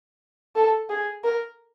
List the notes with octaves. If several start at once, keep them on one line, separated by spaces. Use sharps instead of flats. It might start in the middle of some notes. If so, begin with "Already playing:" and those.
A4
G#4
A#4